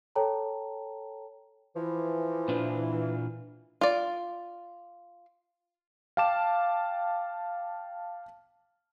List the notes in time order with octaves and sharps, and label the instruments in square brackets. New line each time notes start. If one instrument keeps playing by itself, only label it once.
[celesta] A4 C#5 G5 A5 A#5
[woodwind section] E3 [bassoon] F3
[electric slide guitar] A#2 D4 F4
[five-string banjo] F4 D5
[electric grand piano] F5 G5 A5 D6 E7